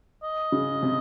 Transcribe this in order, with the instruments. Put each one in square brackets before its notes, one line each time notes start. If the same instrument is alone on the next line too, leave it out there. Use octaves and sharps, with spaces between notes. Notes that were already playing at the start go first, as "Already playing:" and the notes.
[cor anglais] D#5
[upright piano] C#3
C3